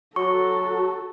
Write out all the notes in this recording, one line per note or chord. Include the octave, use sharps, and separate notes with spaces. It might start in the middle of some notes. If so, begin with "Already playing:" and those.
F#3 F#4 A4 C#6